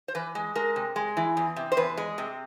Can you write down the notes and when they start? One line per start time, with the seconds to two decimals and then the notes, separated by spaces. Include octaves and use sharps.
0.08 C5
0.15 E3 B4
0.35 G#3
0.55 G#3 A#4
0.76 C3
0.96 G#3
1.17 E3
1.37 E2
1.56 C3
1.72 C5
1.77 E2 B4
1.97 G#3
2.18 C3